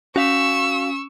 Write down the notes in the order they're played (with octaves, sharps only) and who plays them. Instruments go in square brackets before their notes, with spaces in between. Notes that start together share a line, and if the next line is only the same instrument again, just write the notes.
[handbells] C#4 B6 [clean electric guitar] F#4 F5 [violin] C#6 E6